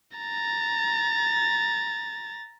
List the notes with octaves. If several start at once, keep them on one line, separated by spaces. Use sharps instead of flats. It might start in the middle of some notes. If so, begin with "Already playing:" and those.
A#5 A6